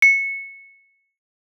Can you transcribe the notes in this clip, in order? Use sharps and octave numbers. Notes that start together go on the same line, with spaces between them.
C#7